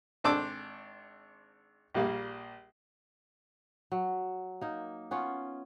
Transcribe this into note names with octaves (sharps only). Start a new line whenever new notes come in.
G#1 D4 C5 A5 D6 E6
A#1 G3 A#3
F#3
A#3 D#4
B3 C#4 F4 C#5